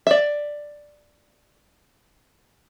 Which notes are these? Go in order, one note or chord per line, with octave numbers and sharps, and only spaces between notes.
D5 E5